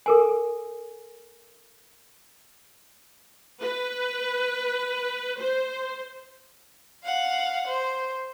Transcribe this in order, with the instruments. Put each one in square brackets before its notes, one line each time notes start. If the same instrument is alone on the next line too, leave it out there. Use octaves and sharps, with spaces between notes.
[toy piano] A4 A#4 G#5
[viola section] B4
C5
[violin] F5 F#5
C5